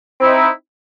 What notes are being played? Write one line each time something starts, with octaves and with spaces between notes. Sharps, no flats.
C4 D#4 E4